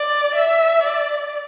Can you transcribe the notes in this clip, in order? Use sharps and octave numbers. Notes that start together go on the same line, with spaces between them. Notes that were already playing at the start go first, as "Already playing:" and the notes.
Already playing: D5
E5
D5